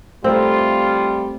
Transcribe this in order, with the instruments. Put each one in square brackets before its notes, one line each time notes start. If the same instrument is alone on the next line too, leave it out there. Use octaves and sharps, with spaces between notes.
[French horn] G3 [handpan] A3 A#4 [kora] C4 [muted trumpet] F4